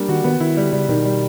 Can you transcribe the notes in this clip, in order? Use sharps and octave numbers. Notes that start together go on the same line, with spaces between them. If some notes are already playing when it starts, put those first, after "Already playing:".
Already playing: G3 A#3 D4
D#3 F#4
D#3 B3
D#3 E4
D3 G3
C#3 G3
B2 D#3
G3